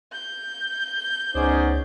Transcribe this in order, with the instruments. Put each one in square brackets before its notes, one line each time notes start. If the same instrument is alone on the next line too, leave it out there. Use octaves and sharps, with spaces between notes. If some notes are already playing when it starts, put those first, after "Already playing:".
[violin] G6
[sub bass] C#2 [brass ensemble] B3 C#4 D#4 [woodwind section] G#4 C5 D5